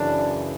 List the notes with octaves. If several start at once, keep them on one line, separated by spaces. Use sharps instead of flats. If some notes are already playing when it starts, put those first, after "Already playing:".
Already playing: F#2 C#3 E3 D4